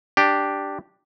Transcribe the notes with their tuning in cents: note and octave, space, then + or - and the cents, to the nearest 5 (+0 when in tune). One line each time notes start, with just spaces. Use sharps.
D4 +0 G4 +0